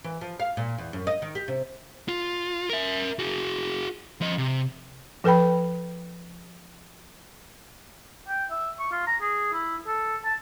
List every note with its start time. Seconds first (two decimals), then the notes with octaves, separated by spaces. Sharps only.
0.04 E3
0.21 F3
0.40 F5
0.57 A#2
0.78 E2
0.93 F#2
1.07 D#5
1.22 D#3
1.35 G4
1.48 C3
2.08 F4
2.69 A#4 E5
3.19 F#4 G#4
4.21 F3 D#5
4.38 C3
5.24 F3 A4 B4 G5 B5
8.28 G5
8.51 E5
8.80 C#6
8.92 F4
9.07 A#5
9.21 G#4
9.53 E4
9.87 A4
10.25 A5